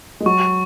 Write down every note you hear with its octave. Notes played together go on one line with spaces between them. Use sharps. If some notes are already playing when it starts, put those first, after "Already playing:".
G#3
F#3 C#6